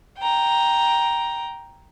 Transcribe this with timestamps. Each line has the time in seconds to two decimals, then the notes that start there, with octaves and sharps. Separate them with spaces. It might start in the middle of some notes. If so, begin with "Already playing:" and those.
0.18 G5 A#5